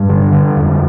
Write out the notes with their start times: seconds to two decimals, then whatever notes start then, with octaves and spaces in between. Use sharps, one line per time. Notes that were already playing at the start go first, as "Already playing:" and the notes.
Already playing: G2 G3
0.09 D3
0.32 D3
0.57 F2